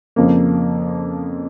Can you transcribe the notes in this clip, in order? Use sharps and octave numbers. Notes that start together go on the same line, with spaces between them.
F2 C#3 F3 A#3